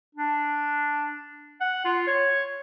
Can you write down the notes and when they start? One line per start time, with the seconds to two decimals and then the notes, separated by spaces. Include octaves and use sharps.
0.15 D4
1.61 F#5
1.85 F4
2.07 C#5